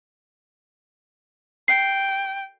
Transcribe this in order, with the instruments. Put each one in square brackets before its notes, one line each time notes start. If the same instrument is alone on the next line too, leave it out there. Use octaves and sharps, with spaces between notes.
[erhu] G5 [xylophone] C7